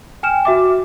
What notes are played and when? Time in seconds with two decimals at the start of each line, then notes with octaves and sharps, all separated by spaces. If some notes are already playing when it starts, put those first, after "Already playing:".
0.23 G5 G#5 F6 E7
0.45 F#4 E5 D6